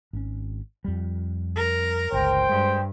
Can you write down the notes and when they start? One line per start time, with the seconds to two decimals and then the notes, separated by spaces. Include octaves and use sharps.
0.13 G#1 C#4
0.85 F2 G3
1.56 A#4
2.12 G1 C#2 C5 G5
2.49 G2 G#3